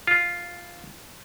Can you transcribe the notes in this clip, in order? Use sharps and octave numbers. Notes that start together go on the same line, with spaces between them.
F4